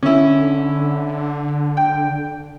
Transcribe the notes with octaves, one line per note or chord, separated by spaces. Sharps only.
D3 C#4 E4
G5